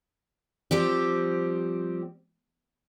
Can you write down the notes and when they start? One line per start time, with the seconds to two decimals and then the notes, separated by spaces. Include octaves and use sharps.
0.71 F3 G3 C4 G4